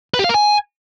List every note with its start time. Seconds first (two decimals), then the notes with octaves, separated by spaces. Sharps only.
0.14 B4
0.19 G4
0.24 F5
0.29 A#4
0.35 G#5